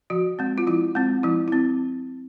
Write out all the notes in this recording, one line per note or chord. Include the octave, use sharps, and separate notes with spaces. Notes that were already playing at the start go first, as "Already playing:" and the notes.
F3 F#4
G#3 C4
F4
F3 E4
G#3 C4
F3 E4
C4 E4